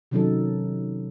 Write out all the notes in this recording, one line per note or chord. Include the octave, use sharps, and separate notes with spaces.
C3 D#3 F#3 C#4 D#4 A4